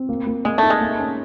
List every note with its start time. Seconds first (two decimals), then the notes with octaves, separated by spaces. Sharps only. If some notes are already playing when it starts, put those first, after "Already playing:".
Already playing: C4
0.09 A#3
0.27 A#3
0.45 G#3 A#3
0.58 A3 D#4
0.70 G#3
0.81 A#3
0.99 C#4